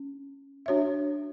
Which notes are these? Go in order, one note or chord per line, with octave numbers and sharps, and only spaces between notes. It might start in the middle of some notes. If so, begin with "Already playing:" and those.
Already playing: C#4
D4 F#4 C#5 E5